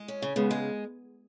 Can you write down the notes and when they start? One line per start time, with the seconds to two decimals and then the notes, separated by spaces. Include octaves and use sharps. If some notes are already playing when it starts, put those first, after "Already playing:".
Already playing: G#3
0.08 C#4
0.22 C#3
0.36 C#3 G#3 B3
0.51 G#3